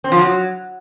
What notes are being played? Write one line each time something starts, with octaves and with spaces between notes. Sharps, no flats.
C4
F3
F#3